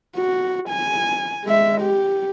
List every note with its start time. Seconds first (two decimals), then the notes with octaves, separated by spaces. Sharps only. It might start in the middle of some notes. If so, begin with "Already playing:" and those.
0.16 F#4
0.69 G#5
1.44 G#3 E5
1.81 G4